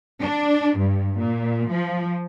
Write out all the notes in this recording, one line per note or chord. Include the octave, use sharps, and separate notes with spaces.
D4
G2
A#2
F3